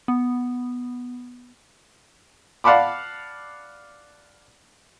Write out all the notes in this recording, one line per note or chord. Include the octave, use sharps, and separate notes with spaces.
B3
D5 F5 F#5 A5 B5 D6